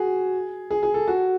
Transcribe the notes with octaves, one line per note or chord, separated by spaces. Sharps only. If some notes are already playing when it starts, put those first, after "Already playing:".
Already playing: F#4 G#4
G#4
G#4
A4
F#4